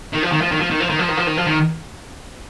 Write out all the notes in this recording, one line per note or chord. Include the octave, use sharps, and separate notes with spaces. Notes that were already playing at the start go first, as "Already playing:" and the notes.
D#3
F3
D#3
F3
D#3
F3
D#3
F3
D#3
F3
D#3
F3
D#3
F3
D#3